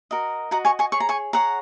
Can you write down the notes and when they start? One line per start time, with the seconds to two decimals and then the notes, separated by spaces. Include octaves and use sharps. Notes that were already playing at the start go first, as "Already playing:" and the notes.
0.11 F#4 A#4 D#5
0.51 F#4 D#5 F#5 A#5
0.65 G#5 C#6
0.79 G#5 C#6
0.92 G#4 C#5 C#6
1.00 A#5
1.09 G#5 C#6
1.33 G#4 C#5 F#5 A#5